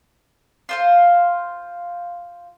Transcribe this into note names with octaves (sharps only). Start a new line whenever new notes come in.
F4 C5 F5